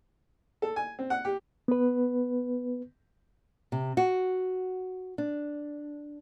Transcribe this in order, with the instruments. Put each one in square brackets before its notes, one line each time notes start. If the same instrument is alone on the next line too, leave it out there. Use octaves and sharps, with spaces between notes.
[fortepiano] A4
G#5
C4
F#5
G4
[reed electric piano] B3 B4
[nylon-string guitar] C3
F#4
D4